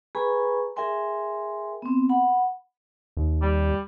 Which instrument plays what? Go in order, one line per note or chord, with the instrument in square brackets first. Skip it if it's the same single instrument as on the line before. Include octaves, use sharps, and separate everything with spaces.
[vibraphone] G#4 B4 G#5 A#5 B5 C#6
G#4 A#4 E5 G5 G#5 C6
B3 C4
F#5 B5
[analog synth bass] D#2
[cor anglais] G3